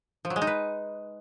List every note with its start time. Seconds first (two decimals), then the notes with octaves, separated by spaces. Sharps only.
0.25 F3
0.30 F#3
0.36 G#3
0.42 D#4
0.47 B4